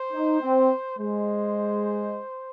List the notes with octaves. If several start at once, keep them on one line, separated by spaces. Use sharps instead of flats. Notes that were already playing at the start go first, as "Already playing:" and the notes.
Already playing: C5
D#4
C4
G#3 C5